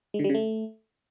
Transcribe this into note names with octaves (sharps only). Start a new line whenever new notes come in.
G#3
D3
G3
C#3
A3